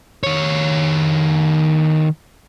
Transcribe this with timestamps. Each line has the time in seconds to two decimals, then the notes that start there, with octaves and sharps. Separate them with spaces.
0.24 D#3 C#5